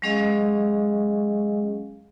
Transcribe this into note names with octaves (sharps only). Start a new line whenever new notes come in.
F#3 G#3 C#4 G#4 D#5 F5